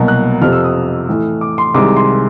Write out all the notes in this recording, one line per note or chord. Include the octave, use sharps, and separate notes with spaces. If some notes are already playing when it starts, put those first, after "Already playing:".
Already playing: C2 B2 F#3 A#3
F#6
F2 C3 F3 F6
E6
D#6
A2 E3 A3
D6
C6
C2 C3 D#3 G#3 D6
C6